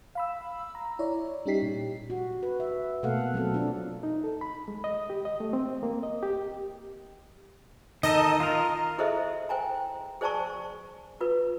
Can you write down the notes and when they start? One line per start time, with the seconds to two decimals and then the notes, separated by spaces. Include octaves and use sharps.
0.15 F5 B5 E6
0.75 A#5
0.99 E4 C#5 D5
1.45 G3 C#4 D#4 G4 B6 C7
1.62 A#2
2.10 F#4
2.43 B4
2.60 E5
3.03 B2 A3 A#3 A4 F5 F#5
3.34 F#3 C4 A4
3.54 D4 F4
4.03 D#4
4.24 A4
4.41 B5
4.68 G#3
4.84 D#5
5.10 G4
5.25 D#5
5.40 A3
5.53 C4
5.83 A#3
6.03 D#5
6.23 G4
8.03 D#3 D#4 A4 D#5
8.40 F4 A#4
8.98 E4 G#4 A4 C5 D#5 E5
9.49 C5 G5 G#5 A#5
10.21 G#4 C5 D5 G#5 A5 C#6
11.21 F4 B4